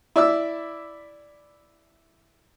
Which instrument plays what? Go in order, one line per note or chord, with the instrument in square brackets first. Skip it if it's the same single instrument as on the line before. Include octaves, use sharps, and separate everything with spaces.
[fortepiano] E4 D5 E5 E6